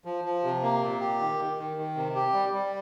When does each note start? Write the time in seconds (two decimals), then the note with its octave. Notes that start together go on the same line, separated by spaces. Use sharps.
0.05 F3
0.25 F3
0.43 C3
0.62 A#3
0.82 A#2
1.00 G4
1.20 D#3
1.39 D#3
1.58 D#3
1.77 D#3
1.95 C3
2.15 G4
2.33 G3
2.53 G3